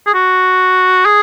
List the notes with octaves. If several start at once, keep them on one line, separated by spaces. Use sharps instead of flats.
G#4
F#4
G#4